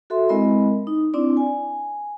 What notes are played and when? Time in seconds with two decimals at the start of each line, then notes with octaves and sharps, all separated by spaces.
0.10 F#4 A4 E5 C6
0.29 G#3 C4 E4 A#4 D#5 B5
0.87 D#4
1.14 C4 D4 E4 D5
1.37 G#5